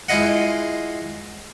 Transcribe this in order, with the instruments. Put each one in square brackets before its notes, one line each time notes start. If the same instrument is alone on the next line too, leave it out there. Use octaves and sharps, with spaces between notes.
[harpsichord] G#3 E4 F4 D#5 F#5